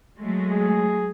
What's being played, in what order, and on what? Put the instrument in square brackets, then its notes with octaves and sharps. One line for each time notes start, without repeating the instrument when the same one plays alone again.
[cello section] F#3 G#3 A3
[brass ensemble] G#4